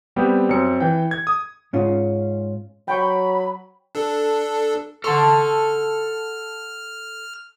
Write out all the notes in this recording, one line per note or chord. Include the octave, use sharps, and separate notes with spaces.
G3 B3 C4 G4
F#2 C4 C#7
E3 G5
G#6
D#6
G#2 C#4 F4
F#3 G5 B5 C#6
D4 A4
A4 F#5 A5 C6 C#6 F6